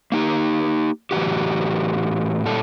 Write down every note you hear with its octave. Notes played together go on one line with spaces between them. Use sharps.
A#3 D#4 G4
A2 E3 F#4 G4
A#2 G3 C#4 A4